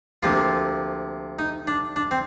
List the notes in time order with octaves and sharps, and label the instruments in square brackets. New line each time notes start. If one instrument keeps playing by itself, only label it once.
[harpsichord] D2 C3 F3 A#3 F4
D#4
D4
D4
C4